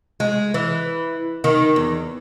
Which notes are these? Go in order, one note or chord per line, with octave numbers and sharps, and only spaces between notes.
G#3
E3
D#3
E2